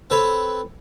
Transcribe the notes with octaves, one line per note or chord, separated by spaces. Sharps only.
C4 A4 B4 C#5